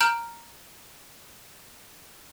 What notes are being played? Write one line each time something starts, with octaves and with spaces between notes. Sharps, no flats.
A#5 F6 G6 D7 F#7